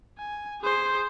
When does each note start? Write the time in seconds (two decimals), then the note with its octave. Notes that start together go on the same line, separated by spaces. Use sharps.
0.19 G#5
0.61 G#4 C5